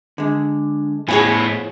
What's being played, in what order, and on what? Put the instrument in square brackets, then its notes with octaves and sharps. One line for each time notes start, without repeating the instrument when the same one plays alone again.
[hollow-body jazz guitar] D3 G#3
[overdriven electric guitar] A2 B3 [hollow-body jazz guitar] F3 [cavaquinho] G#4 C#5 G#5